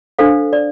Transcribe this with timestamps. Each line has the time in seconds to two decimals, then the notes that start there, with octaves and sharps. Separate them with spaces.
0.19 D4 A4 C5 F5
0.53 D5